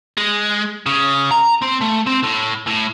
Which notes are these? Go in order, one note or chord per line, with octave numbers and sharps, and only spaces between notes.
G#3
C#3
A#5
C4
A3
C4
A2
A2